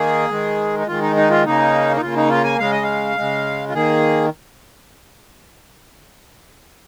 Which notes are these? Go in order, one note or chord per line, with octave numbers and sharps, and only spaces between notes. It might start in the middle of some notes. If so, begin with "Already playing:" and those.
Already playing: D#3 A#3 G#4
D#3 G#3
D#4
D#3 G#3 F4
D#4
D#4
F4
C#3 A#3 D#4
D#4
C#3 A#3 F4
D#4
F4
G#5
C#3 G#3 F5
D#5
F5
C#3 G#3
F4
D#3 A#3 G#4